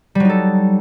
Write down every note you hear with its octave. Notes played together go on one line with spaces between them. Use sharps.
F#3 G3 D#4 A4